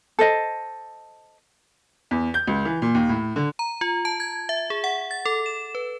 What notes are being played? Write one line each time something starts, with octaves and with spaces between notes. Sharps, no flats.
A4 C5 D#5
E2
G6
C#2
E3
A#2
D#2
A2
D3
A#5
F4
A5
G#6
E5
G#4
F#5
A6
A4
E7
B4